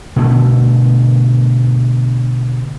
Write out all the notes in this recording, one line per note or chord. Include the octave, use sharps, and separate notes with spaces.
B2 D3 A3